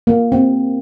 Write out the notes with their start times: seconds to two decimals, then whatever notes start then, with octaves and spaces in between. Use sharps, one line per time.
0.07 A#3
0.32 C4